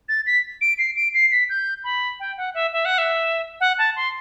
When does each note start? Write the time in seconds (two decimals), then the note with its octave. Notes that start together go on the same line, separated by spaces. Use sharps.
0.09 A6
0.26 B6
0.61 D7
0.79 C7
0.96 D7
1.14 C7
1.31 B6
1.50 G6
1.84 B5
2.20 G5
2.37 F#5
2.54 E5
2.72 E5
2.85 F#5
2.98 E5
3.60 F#5
3.78 A5
3.96 C6